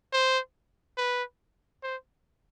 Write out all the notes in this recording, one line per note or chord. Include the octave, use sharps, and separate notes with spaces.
C5
B4
C5